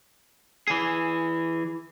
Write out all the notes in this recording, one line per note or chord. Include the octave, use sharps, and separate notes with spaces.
E3 G#4